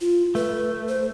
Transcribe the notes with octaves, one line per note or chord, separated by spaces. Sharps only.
F4
A3 B4
C5